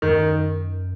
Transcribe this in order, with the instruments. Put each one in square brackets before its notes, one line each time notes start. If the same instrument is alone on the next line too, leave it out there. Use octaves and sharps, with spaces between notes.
[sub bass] F#2 [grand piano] D#3